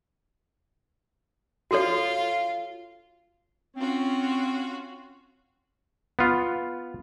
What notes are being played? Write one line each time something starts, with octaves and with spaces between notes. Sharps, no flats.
F4 F#4 A4 C#5
C4 C#4 F4 F#4
B3 F4